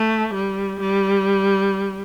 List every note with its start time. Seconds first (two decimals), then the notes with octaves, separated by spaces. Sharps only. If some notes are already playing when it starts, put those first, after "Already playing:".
Already playing: A3
0.34 G3
0.80 G3